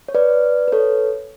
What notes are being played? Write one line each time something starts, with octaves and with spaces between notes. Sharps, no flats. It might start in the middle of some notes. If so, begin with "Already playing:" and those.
C#5
B4 D5
B4
A4 C#5